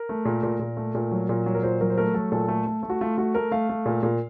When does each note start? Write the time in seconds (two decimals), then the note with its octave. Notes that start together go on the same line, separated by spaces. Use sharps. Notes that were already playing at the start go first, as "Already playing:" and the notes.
Already playing: A#4
0.09 A3
0.25 A#2
0.43 A#2
0.60 A#2
0.77 A3
0.95 A#2
1.11 F#3
1.29 A#2
1.46 F#3
1.54 A#4
1.63 A#2 C5
1.81 F#3 A#4
1.90 C5
1.98 A3 A#4
2.14 F#3 A4
2.32 A#2 A4
2.48 A3
2.67 A3
2.83 A3
2.90 F#4
3.01 A3 F4
3.17 A3 F#4
3.35 A3 A#4
3.51 A3 F5
3.69 A3
3.86 A#2
4.03 A#2